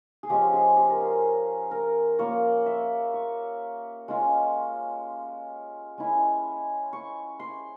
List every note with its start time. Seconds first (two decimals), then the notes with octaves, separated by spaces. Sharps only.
0.23 G#4
0.30 F3 G#3 C#4 G4
0.52 G#4
0.76 G4
0.90 A#4
1.01 G#4
1.71 A#4
2.19 A#3 F4 C#5
2.66 E5
3.14 C#6
4.08 G#3 C#4 F4
5.98 G#3 C#4 E4
6.93 C#6
7.39 C6